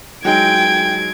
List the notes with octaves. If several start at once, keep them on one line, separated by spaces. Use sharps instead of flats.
F#3 G#3 D#4 G5 G#6 D7